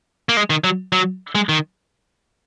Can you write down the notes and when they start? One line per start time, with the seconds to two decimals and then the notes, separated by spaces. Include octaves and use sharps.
0.29 A#3
0.37 G#3
0.50 D#3
0.64 F#3
0.92 F#3
1.35 G#3
1.49 D#3